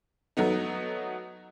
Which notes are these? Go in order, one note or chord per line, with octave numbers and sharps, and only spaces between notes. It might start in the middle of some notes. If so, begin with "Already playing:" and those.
F#3 A3 B3 D#4